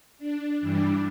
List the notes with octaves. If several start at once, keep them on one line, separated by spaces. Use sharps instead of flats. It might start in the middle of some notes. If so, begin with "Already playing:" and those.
D4
G2 E3 G3 D4